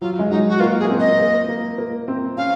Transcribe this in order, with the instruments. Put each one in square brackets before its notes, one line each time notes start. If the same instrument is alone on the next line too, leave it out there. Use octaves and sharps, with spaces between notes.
[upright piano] F#3 [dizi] F4
[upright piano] G#3
[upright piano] F#3 [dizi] D#4
[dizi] F#4
[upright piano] A#3 [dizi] F4
[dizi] G#4
[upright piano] A#3
C4
[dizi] D#5
[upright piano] A#3
A#3
A#3
C4
[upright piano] C#4 [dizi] F5